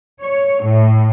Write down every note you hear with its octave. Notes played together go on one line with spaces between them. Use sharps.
C#5
A2